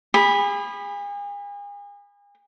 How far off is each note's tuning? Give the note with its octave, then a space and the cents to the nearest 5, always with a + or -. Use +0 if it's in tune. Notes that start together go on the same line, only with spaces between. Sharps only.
G#4 -40 B5 +0